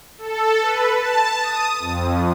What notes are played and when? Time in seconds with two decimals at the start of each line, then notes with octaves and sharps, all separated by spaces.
0.18 A4
0.61 B4
0.93 A5
1.39 D#6
1.79 F2